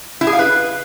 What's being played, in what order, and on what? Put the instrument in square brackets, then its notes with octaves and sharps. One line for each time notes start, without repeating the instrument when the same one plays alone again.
[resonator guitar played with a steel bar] E4
G#4
F5
B4